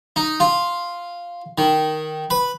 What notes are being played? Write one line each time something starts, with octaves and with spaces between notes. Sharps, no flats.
D#4
F4
D#3
B4